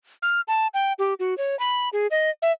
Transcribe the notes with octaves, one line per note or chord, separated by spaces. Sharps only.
F6
A5
G5
G4
F#4
C#5
B5
G#4
D#5
E5